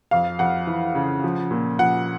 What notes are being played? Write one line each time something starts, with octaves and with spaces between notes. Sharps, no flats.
F2 F5
F2 F#5
E3
C#3
F3
A#2
F3 F#5